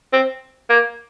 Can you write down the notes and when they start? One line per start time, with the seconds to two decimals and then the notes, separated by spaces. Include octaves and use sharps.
0.13 C4
0.70 A#3